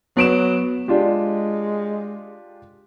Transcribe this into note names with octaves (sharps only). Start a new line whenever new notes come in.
F#3 B3 D7 E7
G#3 D4 F4 G4